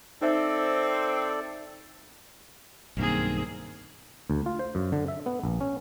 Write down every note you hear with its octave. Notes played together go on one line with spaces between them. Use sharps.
C4 D#4 A4 C5 D5 E5
B1 G2 D#3 A#3 C4 G#4
D2
F4
C5
F#2
D3
E5
B3
A#1
C#4